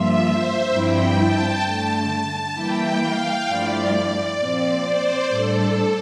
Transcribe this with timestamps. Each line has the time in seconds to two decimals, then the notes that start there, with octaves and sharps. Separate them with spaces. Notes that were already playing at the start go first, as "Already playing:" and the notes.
Already playing: G2 F3 A#3 F4 E5
0.27 C5
0.73 G2 F3 C4 E4 G5
1.19 A5
1.64 G2 D3 A3
2.10 A5
2.56 E3 G3 A#3 E4 G5
3.02 F5
3.47 G2 F3 A3 E4 D5
3.93 D5
4.38 A#2 F3 C4
4.84 C5
5.30 A2 G3 D4 A4